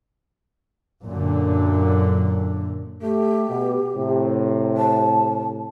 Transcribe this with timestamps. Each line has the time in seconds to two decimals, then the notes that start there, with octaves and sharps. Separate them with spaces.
1.04 F#2 A#2 D3
3.02 A3 G4
3.49 B2
3.96 A2 C3
4.77 A5